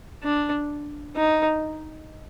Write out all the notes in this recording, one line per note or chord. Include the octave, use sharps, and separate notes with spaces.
D4
D#4